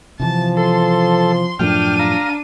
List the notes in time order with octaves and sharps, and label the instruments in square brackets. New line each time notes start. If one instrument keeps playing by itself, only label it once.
[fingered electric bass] C3 E3 [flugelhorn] F3 [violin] A5
[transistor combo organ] A4 [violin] C6
[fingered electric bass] F#2 A2 F3 [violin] D4 D#7 [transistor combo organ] G5 F6
[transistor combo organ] F5 A#5